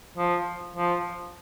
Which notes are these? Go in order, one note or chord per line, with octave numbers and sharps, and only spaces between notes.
F3
F3